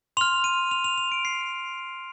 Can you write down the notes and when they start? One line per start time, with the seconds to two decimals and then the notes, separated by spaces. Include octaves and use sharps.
0.17 C6 F6 F7
0.44 D#7
0.71 F7
0.84 F7
0.97 F7
1.12 D7
1.25 C7